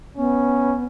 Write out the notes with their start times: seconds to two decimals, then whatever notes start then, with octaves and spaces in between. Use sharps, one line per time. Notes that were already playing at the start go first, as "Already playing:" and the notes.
0.17 B3 C#4